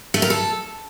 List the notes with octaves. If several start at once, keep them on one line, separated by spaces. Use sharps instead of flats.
A3
A#4
A4